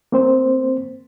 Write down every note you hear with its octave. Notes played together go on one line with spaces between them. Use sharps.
A#3 C4 C5